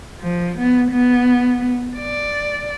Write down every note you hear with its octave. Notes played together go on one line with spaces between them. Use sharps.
F3
B3
B3
D5